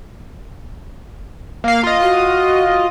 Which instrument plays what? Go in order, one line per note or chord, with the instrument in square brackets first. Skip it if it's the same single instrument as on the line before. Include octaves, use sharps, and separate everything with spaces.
[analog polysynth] A#3 F5
F4 D#5
[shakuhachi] F#4